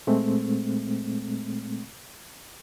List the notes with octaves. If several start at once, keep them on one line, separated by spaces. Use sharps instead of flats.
A#2 G#3 A3 C4